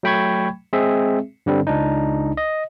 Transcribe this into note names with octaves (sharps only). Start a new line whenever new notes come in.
F#3 A3 G5 B5 C#6 G#6
G#3 C4 G#4 E5
G2 D3 G3 C4
C#2 D4 D#4
D#5